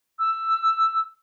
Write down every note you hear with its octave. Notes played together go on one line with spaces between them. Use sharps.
E6